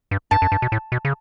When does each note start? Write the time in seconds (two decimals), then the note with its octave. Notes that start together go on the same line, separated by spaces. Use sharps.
0.11 G2
0.31 G2 A5
0.42 F#2
0.52 G2
0.62 B2
0.72 A2
0.92 B2
1.05 C#3